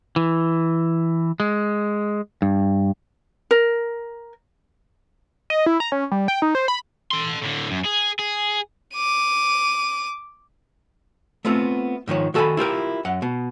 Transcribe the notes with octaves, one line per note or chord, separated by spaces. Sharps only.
E3
G#3
G2
A#4
D#5
E4
A#5
C#4
G3
G5
D#4
C5
B5
A4 C6
A2 D3
F#2
G#4
G#4
D6 D#7
A3 B3 C4 F4
G#2 D#3 F3 C#5
D#3 F#4 A4 D#5 G#5 B5
E4 F4 G4 A#4
F#2 F#5
B2